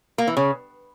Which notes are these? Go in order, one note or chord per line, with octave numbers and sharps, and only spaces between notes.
A#3
E3
C#3